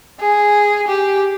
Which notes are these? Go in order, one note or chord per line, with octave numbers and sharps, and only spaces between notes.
G#4
G4